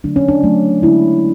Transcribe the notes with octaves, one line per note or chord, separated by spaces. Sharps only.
D3 F#3 A3 D4
C#4
D4
D3 F#3 A3
D3 G#3 E4